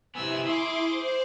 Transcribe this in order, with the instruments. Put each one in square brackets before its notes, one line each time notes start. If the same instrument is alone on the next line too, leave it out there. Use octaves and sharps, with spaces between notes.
[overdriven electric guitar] C3 B3 [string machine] E4 [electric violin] G#5 E6
[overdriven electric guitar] G#4 [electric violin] C6 D6
[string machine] C5